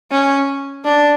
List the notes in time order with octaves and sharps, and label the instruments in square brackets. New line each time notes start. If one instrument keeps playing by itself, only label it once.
[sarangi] C#4
D4